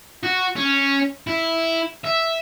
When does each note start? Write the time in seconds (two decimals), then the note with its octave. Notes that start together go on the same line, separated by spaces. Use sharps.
0.23 F#4
0.56 C#4
1.27 E4
2.04 E5